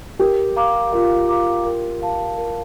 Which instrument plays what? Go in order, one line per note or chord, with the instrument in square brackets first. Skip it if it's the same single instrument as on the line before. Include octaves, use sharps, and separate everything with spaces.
[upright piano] G4 [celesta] A#4
[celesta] F5 A#5 D6
[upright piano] F4 [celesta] A#4
[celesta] F5 A#5 D6
A#4
F5 A5
A#4